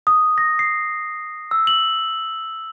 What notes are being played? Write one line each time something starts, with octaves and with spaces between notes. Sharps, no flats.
D#6
A#6
C7
E6
F#7